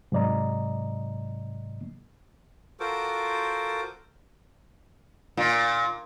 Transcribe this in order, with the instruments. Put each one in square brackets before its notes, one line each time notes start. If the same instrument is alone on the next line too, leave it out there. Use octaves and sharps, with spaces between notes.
[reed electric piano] G#2 C3 F#3 D5 D#5 A#5
[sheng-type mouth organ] F4 F#4 A4 A#4 C5 D6
[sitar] A#2